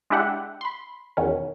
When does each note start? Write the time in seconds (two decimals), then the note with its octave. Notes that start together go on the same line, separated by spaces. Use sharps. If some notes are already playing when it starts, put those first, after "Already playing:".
0.10 G#3 D4 E4 G4 E5 F#5
0.61 B5 C6
1.17 E2 B2 D#3 C#4